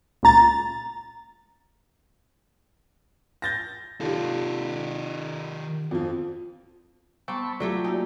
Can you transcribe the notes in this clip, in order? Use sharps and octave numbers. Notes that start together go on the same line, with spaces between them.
C#2 A#2 A#5 A6
G6 A6 A#6
D#3 F4 G4 A4
F2 F3
G3 B3 C4 A5 B5 C#6 D6
F#3 A3 F4 G4 A4 D5
A#3 D#4 F#4